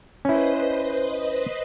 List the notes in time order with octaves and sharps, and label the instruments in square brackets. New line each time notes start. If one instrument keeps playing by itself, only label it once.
[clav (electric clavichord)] C#4 E4 [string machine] B4 C5 D#5